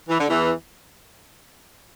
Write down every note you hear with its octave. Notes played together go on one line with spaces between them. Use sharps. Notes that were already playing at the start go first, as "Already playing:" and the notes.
E3
D3
E2 E3